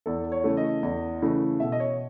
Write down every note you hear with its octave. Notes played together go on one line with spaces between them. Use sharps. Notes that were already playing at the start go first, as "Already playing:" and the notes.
E2 A4
C#5
C#3 E3 A3
D#5
E2
C#3 E3 A3
B2 E5
D#5
C#5